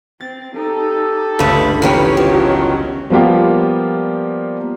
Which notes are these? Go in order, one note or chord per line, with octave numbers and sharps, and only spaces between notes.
C4 A6
D#4 G4 A4
G1 C#2 G2 A3 B5
D#3 E3 C#4 G4 C#5
E2 D#3 F3 F#3
F3 G3 A#3 B3 F4 G4